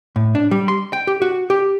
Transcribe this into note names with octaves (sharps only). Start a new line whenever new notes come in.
A2
D4
G3
C6
G5
G4
F#4
G4